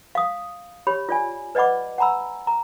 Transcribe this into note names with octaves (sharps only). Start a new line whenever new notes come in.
F5 D#6
G4 C#5 B5
F4 D5 G#5
B4 D5 D#5 F#5 B5 D6
F#5 G#5 A#5 B5 E6
A#5